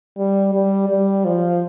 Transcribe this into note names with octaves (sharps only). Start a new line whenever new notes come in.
G3
G3
G3
F3